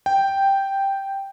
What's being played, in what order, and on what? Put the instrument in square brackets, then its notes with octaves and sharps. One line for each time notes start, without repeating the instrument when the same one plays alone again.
[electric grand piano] G5